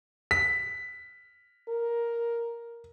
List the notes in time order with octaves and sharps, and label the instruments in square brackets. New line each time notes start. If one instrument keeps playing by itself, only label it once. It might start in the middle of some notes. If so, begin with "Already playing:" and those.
[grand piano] B6
[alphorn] A#4